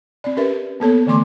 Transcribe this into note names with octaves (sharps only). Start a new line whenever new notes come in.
C4 D5
C#4 G4 A#4 B4 E5
A#3 B3 A4 C#5
D3 E3 A3 C6 D6